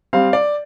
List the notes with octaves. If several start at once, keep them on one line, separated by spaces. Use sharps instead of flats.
G3 C4 F5
D5